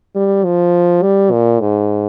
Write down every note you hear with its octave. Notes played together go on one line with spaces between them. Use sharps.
G3
F3
G3
A#2
G#2